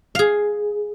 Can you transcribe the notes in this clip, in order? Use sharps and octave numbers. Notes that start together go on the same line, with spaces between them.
G#4 F5